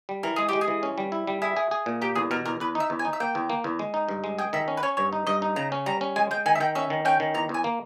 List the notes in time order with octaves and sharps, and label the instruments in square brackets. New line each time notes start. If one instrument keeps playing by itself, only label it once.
[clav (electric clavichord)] G3
[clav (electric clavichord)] E3 [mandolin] A#4
[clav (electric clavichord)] G#3 [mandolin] G#4
[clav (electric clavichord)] G#3 [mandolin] G4
[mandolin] G#4
[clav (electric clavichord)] E3
C#4
G3
E4
G3
[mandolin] E4 [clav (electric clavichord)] G#4
[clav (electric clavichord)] G#4
G#4
A#2
[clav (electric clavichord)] A#3 [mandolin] G4
[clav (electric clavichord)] E2 [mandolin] G#4
[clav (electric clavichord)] B2 [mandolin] A#4
[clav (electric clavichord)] E2 [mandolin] A#4
[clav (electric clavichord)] E2 [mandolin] B4
[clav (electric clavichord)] D#4
[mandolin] E5
[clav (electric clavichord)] E2
[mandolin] G#5
[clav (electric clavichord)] D#4
[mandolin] E5
[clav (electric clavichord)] A#3 [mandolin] G5
[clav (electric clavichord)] E2
A#3
E2
G#3
D#4
G2
G#3
[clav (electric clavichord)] G#4 [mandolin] G5
[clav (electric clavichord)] D#3 [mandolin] E5
[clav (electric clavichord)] C#4
[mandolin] B4
[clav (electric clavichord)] C#4 [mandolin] C#5
[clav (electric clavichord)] G2 [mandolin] C#5
[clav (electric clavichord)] D#4
[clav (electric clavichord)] G2 [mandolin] D#5
[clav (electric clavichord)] D#4
[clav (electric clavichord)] C#3 [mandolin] A#5
[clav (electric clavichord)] C#4
[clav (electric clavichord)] G3 [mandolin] A#5
[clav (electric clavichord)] C#4
[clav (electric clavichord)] G#3 [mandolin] G#5
[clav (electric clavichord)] G#3 [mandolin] G5
[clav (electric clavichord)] D#3 [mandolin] G#5
[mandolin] E5
[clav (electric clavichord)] D#3 [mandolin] G5
[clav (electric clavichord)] C#4 [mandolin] E5
[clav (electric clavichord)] D#3
[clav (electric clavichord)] C#4 [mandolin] G5
[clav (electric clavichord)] D#3
[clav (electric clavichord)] E2 [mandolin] A#5
[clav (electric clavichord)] E2
[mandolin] G#5
[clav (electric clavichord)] A#3